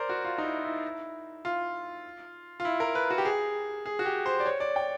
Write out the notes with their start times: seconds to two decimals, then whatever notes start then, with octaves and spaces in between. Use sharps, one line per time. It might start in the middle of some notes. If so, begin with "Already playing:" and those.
Already playing: A#4 C5 D5
0.09 F#4
0.25 F4
0.38 D#4
0.44 E4
0.65 E4
1.45 F4
2.60 F4
2.65 E4
2.80 A#4
2.95 B4
3.10 F#4
3.18 G4
3.25 G#4
3.86 G#4
3.99 F#4
4.06 G4
4.26 C5
4.40 D5
4.46 C#5
4.60 D5
4.76 G5